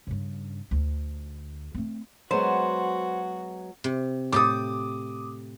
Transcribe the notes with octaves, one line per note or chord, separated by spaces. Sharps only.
G2 C#3
D2
A3 C4
F#3 G#3 B3 F#4 C5
C3
A2 G4 A4 D6 D#6